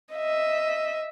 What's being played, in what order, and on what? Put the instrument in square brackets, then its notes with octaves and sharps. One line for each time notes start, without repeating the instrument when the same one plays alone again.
[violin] D#5 E5